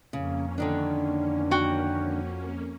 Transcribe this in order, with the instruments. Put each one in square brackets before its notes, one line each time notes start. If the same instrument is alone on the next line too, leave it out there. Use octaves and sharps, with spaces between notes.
[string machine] F2 A#3 C#4 [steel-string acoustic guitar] C#3
[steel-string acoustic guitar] D3 D#3 D4
[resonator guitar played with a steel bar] F#4 G5